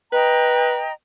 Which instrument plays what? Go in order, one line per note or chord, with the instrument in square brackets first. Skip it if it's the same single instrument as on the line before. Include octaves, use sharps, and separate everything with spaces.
[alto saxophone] B4 [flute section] D#5 G5 A#5